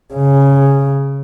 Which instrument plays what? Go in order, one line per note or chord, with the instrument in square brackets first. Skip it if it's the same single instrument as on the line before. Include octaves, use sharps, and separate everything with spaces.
[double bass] C#3